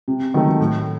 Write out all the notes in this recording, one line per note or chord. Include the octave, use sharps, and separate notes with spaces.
C3
D#3 F#3 A3
A2